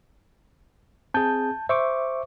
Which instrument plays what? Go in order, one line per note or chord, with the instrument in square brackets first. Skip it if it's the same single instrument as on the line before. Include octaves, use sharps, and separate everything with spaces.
[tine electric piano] C4 G#4 [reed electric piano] A5 G6
[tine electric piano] C5 C#6 D6 [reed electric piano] E5